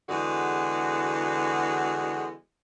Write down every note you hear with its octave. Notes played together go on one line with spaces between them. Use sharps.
E2 D3 G#3 F#4